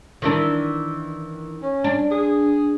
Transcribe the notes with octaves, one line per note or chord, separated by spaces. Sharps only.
D#3 E3 D4
C#4
D4
G#4